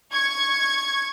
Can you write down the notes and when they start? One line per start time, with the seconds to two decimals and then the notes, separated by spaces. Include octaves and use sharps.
0.12 C#6 G#6